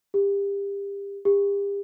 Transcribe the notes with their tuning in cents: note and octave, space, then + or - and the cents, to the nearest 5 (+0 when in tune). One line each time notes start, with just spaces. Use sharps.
G4 +30
G4 +40